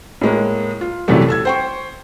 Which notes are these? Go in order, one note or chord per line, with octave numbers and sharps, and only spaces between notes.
A2 G#3 A#3
F4
C2 F#2 C3 E3 G3 A3
A4 E6 G#6
C5 G5 C#6